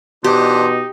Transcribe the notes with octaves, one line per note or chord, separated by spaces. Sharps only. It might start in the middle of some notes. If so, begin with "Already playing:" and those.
B2 E3 D4 D#4 G4 C5